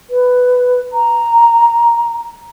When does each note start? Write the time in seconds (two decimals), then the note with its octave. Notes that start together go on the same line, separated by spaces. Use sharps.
0.10 B4
0.93 A#5